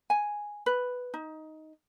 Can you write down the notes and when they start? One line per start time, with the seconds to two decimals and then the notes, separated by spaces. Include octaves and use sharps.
0.10 G#5
0.66 B4
1.14 D#4